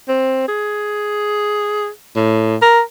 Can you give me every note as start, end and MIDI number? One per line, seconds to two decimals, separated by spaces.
0.08 0.46 60
0.48 1.88 68
2.16 2.56 45
2.62 2.81 70